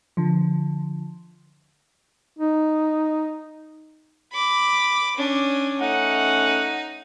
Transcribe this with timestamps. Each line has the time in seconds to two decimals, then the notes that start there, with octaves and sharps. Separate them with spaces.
0.17 D3 F3
2.39 D#4
4.33 B5 D6
5.16 C#4 D4
5.80 A3 C#4 D#4 F#5